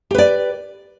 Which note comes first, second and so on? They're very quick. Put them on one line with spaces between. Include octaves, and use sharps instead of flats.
G4 B4 D5